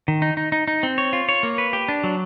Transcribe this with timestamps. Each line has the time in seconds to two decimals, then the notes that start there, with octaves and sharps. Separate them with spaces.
0.08 D#3
0.22 D#4
0.37 D#4
0.52 D#4
0.68 D#4
0.83 C4
0.98 C#5
1.13 F4
1.29 C#5
1.43 A#3
1.58 B4
1.73 G4
1.89 D4
2.04 F#3